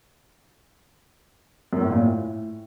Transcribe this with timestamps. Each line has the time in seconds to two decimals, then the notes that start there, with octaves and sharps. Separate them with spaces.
1.73 F#2
1.81 A2
1.90 A#2
1.98 A2